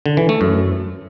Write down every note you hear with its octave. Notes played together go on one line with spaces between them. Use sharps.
D3
E3
A3
F#2